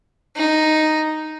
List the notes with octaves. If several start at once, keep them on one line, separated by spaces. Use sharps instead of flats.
D#4